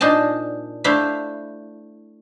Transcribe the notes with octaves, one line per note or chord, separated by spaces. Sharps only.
A#2 D4 D#4 C5 G#5 A5
A3 D4 E4 C5 E5 F5